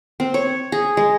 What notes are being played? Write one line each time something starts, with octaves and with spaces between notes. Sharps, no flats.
C4
C#5
G#4
G#3